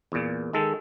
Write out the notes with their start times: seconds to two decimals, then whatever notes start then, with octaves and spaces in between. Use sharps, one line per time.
0.12 E2 A#2
0.53 D#3 G#3 A4